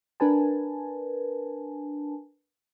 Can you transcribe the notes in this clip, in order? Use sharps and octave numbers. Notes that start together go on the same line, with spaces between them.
D4 A#4 B4 G#5 A5